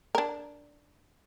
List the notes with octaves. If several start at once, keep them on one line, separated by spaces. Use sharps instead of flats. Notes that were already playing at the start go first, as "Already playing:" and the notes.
D4 A#4